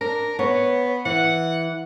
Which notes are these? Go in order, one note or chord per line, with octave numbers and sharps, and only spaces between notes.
D4 A#4
B3 C#5
E3 F#5